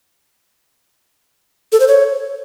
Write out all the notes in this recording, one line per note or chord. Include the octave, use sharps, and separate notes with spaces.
A4
C5
C#5